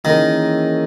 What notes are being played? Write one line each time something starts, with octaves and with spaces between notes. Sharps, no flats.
D#3 E3 A#3 C#4 E4 G#4